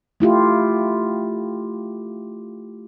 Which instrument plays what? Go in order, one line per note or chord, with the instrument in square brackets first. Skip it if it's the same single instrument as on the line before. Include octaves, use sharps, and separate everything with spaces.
[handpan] A3 E4 F4 G4